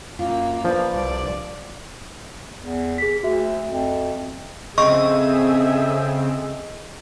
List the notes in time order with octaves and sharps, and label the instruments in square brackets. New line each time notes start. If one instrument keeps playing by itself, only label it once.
[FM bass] F#2 [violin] A#3 [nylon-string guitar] F4
[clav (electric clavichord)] F3 [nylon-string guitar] D4 B4
[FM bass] C2 [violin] D5
[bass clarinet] E2
[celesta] G#4 B6
[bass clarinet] D2 [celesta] F#4 E5
[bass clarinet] F2
[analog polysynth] C#3 C4 [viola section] G#4 A4 E5 [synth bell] D#5 [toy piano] C#6